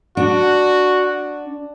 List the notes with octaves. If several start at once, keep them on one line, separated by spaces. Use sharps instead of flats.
D4 F#4